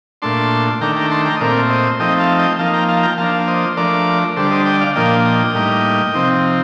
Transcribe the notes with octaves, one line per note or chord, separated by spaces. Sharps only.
A#2 A3 D4 A5 C6
D#3 A3 D4 G5 A#5
G5 A#5
A5 C6
G5 A#5
D#5
A#2 A3 C4 A#4 D5
C5 D#5
F3 A3 C4 D#4 D#5 G5
F5 A5
D#5 G5
F3 A#3 D#4 F5 A5
G5 A#5
F5 A5
G5 A#5
F3 A#3 D4 F5 A5
C5 D#5
F3 A3 D4 A#4 D5
D3 G3 D4 A4 C5
C5 D#5
D#5 G5
D5 F5
A#2 F3 A#3 D4 D#5 G5
D#5 G5
A2 G3 A#3 D#4
C3 F3 C4 D#4